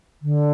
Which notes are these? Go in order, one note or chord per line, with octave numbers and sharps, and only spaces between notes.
D3